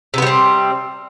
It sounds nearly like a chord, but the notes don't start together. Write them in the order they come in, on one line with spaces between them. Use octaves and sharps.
C3 B3 G3 C4